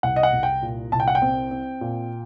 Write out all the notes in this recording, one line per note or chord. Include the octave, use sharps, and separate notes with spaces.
C2 F#5
D#5
F#5
C2
G5
A#2
C2 A5
G5
F#5
G5
C4
C4
A#2